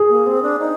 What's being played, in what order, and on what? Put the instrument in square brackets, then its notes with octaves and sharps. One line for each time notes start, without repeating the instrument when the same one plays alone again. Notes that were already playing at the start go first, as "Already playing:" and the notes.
Already playing: [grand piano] G#4
[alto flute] A#3
C4
D4
D#4